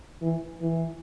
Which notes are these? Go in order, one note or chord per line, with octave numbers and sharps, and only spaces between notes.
E3
E3